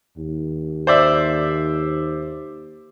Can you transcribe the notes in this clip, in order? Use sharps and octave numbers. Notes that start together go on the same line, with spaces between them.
D#2
C5 D5 E5